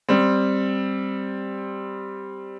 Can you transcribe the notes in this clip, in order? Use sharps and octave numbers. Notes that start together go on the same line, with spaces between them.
G3 C4